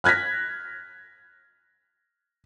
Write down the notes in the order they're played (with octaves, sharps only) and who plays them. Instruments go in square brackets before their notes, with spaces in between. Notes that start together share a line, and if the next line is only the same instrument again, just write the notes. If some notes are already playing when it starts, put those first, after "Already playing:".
[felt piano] F6 F#6 G#6 A#6 B6